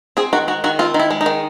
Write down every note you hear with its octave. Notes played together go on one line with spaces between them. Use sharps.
C4 G#4
D#3 F#4
G#3 F#4
D#3 F#4
C4 F4
D#3
E4
G#3
D#4
D#3